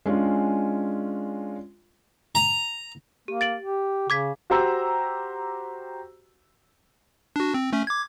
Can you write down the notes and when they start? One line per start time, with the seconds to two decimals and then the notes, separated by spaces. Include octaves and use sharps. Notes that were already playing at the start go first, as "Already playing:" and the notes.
0.06 G#3 C#4 D4 F4
2.35 A#5
3.28 A#3 G4
3.41 A6 D7 F#7
3.61 G4
4.10 C#3 D6 G#6 B6
4.50 F#4 G4 C5 A#5 E6
7.36 D4 F#4
7.54 C4
7.73 A3 C#4
7.87 D6 G#6